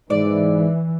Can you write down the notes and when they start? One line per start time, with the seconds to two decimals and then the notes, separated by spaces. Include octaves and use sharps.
0.10 G#2 E3 D5